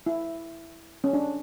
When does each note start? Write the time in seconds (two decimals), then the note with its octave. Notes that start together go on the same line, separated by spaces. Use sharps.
0.06 E4
1.04 C#4
1.13 D4